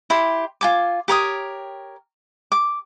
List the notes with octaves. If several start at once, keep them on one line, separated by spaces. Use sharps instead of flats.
E4 G4 C6
F4 G#5 D6
G4 A#4 C#5 D#6
D6